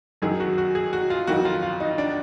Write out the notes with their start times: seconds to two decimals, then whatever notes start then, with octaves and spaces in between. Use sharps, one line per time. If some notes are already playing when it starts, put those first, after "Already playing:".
0.22 F#2 D#3 F#3 G#4
0.40 F#4
0.58 F#4
0.75 G#4
0.93 F#4
1.10 F4
1.27 F2 D#3 F#3 F#4
1.45 F4
1.63 F4
1.80 D#4
1.98 D4